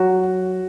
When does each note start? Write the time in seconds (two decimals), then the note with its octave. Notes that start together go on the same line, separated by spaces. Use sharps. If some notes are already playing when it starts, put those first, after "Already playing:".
Already playing: F#3 F#4